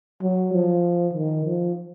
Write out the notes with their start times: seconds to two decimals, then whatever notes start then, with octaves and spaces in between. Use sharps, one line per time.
0.22 F#3
0.53 F3
1.14 D#3
1.45 F3